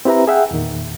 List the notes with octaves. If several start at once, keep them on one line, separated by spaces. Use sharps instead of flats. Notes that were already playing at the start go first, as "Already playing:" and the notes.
C4 E4 G4 B4 E5 A#5
G#4 E5 F#5 G5
E2 A#2 D#3